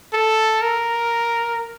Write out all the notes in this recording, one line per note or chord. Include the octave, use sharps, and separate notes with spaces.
A4
A#4